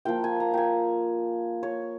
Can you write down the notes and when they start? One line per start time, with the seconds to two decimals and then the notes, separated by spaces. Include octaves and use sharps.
0.05 F3 A#3 F4 G5
0.24 G#5
0.40 A#5
0.54 G5 G#5
1.63 C#5